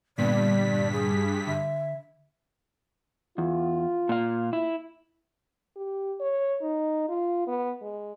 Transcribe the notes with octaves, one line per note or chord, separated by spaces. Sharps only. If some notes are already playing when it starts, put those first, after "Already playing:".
G2 A#2 D3 B3 D5 B6
G#4
D3 E5
E2 F4
A#2 F5
E4
G4
C#5
D#4
F4
B3
G#3